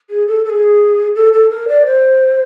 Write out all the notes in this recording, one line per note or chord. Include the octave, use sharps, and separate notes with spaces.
G#4
A4
A4
G#4
A4
A4
A#4
D5
C5